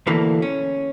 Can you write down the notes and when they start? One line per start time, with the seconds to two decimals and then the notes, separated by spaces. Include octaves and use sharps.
0.07 D2 B2 E3 A3 A#3
0.42 C#4